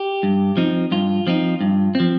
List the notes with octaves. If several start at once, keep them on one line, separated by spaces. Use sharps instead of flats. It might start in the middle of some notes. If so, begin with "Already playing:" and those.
Already playing: G4
G2
F3 C4 D#4
G2 F4
F3 C4 D#4
G2
F3 C4